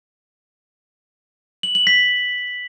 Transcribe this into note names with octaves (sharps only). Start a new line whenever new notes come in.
F#7
F#7
B6